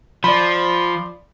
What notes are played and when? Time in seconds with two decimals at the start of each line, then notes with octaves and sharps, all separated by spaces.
0.24 F3 D5 B5